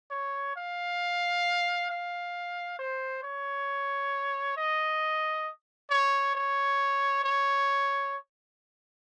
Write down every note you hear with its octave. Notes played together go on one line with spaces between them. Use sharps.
C#5
F5
F5
C5
C#5
D#5
C#5
C#5
C#5